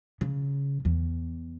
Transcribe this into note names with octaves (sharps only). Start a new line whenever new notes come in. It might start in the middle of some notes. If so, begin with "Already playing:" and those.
C#3
E2